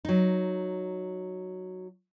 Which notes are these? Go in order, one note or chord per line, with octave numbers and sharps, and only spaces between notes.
F#3 D#4